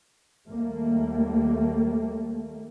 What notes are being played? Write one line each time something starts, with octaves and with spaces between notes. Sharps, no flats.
D#2 G3 A3 A#3